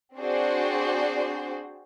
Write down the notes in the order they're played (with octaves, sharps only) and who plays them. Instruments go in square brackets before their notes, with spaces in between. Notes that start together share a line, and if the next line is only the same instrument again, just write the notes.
[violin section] C4 D4 F#4 G#4 C5 D5